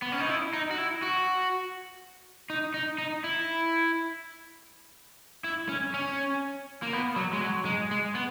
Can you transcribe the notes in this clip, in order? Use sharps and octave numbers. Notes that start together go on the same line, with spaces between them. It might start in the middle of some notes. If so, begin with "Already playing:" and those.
B3
C#4
D#4
E4
D#4
F#4
E4
F#4
D#4
D#4
D#4
E4
E4
C#4
C#4
A#3
B3
F#3
G#3
F#3
G#3
G#3
B3